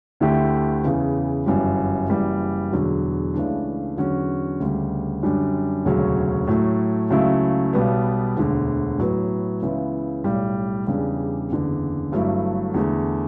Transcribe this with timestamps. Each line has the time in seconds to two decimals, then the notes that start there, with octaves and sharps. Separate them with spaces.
0.20 D2 D3 A3 E4 G4
0.84 E2 C#3 E3
1.46 G1 F#2 E3 G3
2.09 F#1 F#2 E3 G3
2.72 E1 E2 D3 F#3
3.34 C#2 C#3 E3 A3 D4
3.98 E2 D3 F#3 C#4 F#4
4.60 D2 C#3 G3
5.23 F#2 D3 G3 D4
5.85 E1 D2 C#3 F#3 C#4
6.47 A2 F#3 A3
7.10 C#2 C#3 F#3 A3 E4
7.73 B1 B2 G3 B3
8.37 E1 D2 D3
8.98 A2 F#3 B3
9.62 C#2 C#3 E3 B3 E4
10.24 B1 A2 G3
10.87 E2 C#3 G3 D4
11.50 F#1 E2 D3
12.11 G1 G2 F#3 A3 E4
12.74 E2 D3 A3